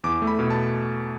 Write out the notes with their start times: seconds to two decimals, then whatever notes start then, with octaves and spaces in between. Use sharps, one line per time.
0.04 E2 D6
0.22 A3
0.27 B5
0.39 B2
0.50 A5